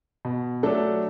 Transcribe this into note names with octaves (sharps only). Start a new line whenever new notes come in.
B2
F#3 A3 D4 A4